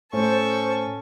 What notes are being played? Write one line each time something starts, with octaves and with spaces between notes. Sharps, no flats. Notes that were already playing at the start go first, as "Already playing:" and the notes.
A2 C#4 A4 C5 C#6